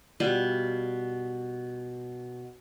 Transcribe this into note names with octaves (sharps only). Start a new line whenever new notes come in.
B2 G3 F4